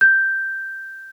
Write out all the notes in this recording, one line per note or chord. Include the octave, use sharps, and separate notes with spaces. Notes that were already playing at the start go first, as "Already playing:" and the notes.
G6